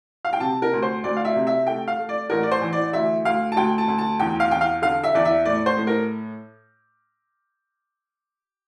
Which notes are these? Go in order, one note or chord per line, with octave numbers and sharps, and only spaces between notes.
F5
G5
C3 A5
A#4
D2
C5
D2 D5
F5
E5
C3
E5
A3 G5
F5
A3
D5
A1 A#4
D5
C5
E3
D5
D2 E5
D2 F5
A5
D2 G5
A5
D2
A5
E2 G5
F5
E2 G5
F5
D3 F5
E5
E2 D5
E5
A2 D5
C5
A2
A#4